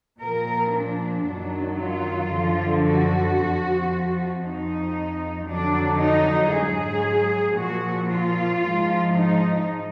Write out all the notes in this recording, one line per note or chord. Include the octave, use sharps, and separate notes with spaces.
A#2 F3 A#4
D4
F#2 D#3 F#3
F4
F#2 D3 F3
F#4
F2 F3
F2 F3 D#4
F2 D3 F#3 D4
D#4
G#2 F#3 G#4
A#2 F3 F#4
F4
G#2 F3
D#4